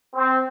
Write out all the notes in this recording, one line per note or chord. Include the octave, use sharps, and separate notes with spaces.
C4